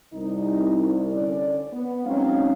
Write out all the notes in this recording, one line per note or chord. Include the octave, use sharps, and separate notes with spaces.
C2 D#4
D3 C#4 D5
B3
F#3 G#3 C4 C#4 D#4 F5